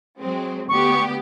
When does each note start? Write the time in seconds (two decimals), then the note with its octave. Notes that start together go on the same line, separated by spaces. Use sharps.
0.18 F#3 G#3 C4
0.69 D2 B3 G4 C#6